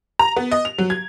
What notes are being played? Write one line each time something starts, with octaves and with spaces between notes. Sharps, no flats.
A#5
B3
D#5
F7
F#3
G#6